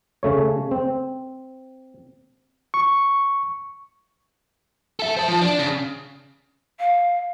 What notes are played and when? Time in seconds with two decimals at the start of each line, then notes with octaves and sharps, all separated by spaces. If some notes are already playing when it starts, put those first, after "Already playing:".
0.23 C#3 A3 C#5
0.71 C4
2.74 C#6
5.00 A4 E5
5.17 C5 A5
5.28 F3
5.42 D4
5.59 C#3
6.79 F5